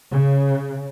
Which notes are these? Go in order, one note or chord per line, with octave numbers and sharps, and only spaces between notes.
C#3